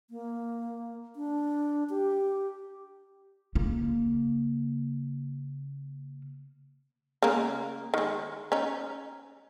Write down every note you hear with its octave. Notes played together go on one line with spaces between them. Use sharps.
A#3
D4
G4
C#3 A#3
C#3 G#3 A#3
D#3 G#3
C#4 D#4